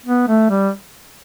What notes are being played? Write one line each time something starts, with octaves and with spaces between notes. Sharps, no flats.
B3
A3
G3